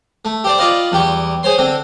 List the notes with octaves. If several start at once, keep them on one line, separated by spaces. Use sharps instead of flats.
A3
G4 C5 D5
F4 D5 D#5 F5 B5
E2 G3 G4 C#6
G#4 C5 C#5 C6
D3 C4 G5